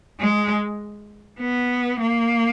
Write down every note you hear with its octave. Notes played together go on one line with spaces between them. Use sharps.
G#3
B3
A#3